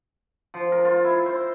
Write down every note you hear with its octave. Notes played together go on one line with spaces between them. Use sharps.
F3
A#4
F4
E4
C5